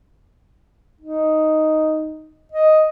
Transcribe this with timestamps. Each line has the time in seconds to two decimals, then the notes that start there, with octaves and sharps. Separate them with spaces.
1.01 D#4
2.52 D#5